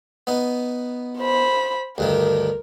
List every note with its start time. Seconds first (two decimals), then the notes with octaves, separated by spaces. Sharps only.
0.27 B3 D#4
1.19 C5 B5
1.98 D2 G2 D#3 A#4